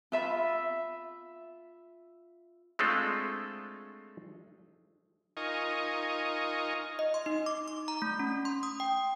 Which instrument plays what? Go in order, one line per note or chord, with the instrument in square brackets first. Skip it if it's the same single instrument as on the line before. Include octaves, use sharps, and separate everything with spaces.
[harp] F4 E5 B5
[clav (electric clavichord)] G#3 A3 C4 D4 F4 A4
[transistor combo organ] D#4 F4 A#4 D#5 G#5 C#6
[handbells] D#5
C6
D#4
D6
D6
A#5
A3
C#4
C6
D#6
G5